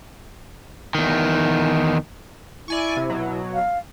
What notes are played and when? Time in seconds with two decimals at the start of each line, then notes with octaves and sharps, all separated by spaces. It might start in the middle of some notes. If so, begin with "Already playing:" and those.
0.95 E2 D#3
2.68 E4 D5 G#5 C#6
2.97 C3
3.10 B2 F#3
3.54 F5